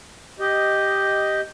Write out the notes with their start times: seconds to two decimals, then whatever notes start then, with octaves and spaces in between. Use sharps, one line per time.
0.39 G4 D#5